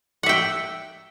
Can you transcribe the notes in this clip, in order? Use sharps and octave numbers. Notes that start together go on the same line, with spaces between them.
E5 F#5 G5